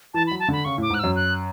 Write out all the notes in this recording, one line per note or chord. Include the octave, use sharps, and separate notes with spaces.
E3 A5
B5
F#3
A5
D3 B5
C#3 C#6
A2
D6
G#2
F#6
F#2 E6
F#6